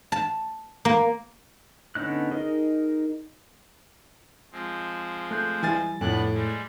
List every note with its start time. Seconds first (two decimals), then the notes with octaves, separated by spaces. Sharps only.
0.12 A5
0.85 A#3
1.95 D3 B3 C#4 D#4 F#6
2.31 D#4 G#4 A#4 D#5
4.52 F3 G#3 C4
5.31 A3 F#6 G6
5.63 E3 G3 G#5 A6
6.01 F2 A2 B3 D4 F#6
6.33 G3 G#3